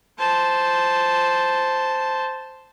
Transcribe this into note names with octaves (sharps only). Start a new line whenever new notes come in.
C5 A5